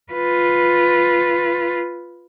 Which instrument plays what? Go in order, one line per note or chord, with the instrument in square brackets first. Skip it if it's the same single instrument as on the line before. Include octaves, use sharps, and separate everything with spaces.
[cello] F4 B4